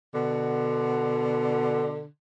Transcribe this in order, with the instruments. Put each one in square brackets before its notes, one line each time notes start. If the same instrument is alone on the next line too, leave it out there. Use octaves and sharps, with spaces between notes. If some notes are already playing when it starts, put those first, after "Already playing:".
[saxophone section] B2 D3